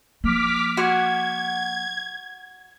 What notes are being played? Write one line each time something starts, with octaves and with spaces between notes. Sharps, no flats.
F3 A#3 D6 F6 B6
F#4 F#5 C6 G#6